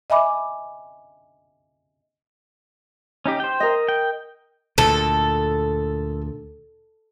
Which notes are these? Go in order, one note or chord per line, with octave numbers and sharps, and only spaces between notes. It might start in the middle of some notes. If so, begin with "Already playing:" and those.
D#5 E5 G#5 B5 D6
C#4 D#4 G4
C5 G5
A#4 D#5
G5
D2 A#2 A4